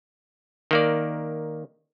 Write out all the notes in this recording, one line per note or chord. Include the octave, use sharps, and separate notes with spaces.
D#3 A#3 D5